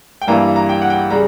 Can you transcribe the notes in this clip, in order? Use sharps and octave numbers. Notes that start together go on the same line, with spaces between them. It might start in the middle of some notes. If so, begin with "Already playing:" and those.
G5
G2 E3 G3 A#3 A#5
A#5
G5
F#5
G5
C#3 G3 A#5